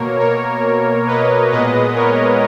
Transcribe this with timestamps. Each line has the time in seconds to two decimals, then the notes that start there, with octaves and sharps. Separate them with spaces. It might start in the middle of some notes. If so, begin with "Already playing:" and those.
Already playing: B2 A#3 A#4 C#5
0.20 A#4 C#5
1.07 B4 D#5
1.51 A#2 G#3 B3 B4 D#5
1.95 A#4 C#5